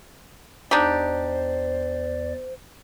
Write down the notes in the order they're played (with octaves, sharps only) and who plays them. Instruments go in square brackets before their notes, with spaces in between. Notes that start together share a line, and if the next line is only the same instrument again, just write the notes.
[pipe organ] E2 D5 [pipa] D4 D#4 G4 [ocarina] C5